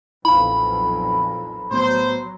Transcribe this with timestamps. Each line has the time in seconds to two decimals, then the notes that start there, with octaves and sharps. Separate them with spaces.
0.25 B1 F2 A#2 E4 F5 B5
1.71 A2 F#3 B3 C5